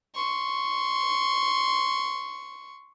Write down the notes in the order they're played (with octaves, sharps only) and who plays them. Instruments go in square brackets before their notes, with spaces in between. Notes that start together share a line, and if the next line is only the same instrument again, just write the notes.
[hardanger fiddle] C6 C#6